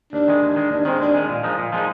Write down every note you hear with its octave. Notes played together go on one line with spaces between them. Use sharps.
D#2 D4
D#3 G#3
D#2
D#3 G#3
D#2 D4
D#3 G#3 C4
D#2 D4
D#3 G#3
A#2
F3 G#3 D#4
A#2
F3 G#3 D#4